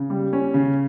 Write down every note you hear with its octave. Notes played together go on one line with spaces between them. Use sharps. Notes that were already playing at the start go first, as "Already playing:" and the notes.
Already playing: C#3
G3
C#4
C#3